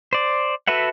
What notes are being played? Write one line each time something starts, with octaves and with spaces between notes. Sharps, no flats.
C5 D5
F#4 A4 B4 E5 F#5